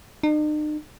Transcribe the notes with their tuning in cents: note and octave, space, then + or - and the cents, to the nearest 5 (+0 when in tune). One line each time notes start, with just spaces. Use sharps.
D#4 -45